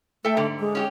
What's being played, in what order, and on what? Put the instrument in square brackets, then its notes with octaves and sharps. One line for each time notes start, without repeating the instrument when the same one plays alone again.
[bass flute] A3 [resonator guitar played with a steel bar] A4 E5 G5
[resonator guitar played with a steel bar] G#2 D3 G3
[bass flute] G#3
[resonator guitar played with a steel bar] C#4 F#4 G4